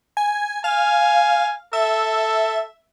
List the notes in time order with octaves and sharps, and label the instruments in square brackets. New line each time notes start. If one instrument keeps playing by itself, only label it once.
[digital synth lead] G#5
[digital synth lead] F5 [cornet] G#5
[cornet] A4 [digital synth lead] E5